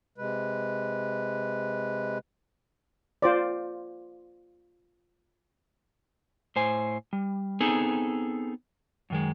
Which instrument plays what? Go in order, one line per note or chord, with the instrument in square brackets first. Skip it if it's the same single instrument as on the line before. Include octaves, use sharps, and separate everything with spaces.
[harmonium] C3 G#3 B4
[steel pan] F4 C5 D5
[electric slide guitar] A2 C5 G#5
G3
B3 C4 D#4 G#4 A4 G#5
F#2 D#3 G#3